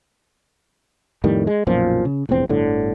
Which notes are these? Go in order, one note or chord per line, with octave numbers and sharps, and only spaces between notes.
F2 A2 D#3 G3
G#3
B1 F#2 A#2 F3
C#3
F1 A#1 E2 C4
G1 A2 D3